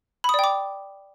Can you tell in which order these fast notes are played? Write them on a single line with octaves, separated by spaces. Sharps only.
B5 D#6 D5 G5 D6